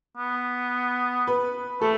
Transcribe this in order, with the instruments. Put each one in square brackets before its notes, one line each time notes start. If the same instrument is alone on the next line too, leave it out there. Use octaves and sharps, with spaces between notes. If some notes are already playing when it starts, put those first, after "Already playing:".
[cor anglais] B3
[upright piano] B4
[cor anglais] A3 [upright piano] A4